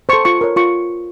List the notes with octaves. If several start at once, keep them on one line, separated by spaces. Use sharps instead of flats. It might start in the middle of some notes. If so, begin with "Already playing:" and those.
A4 C5 C#6
F4 C#6
A#4 C#5
F4 C#6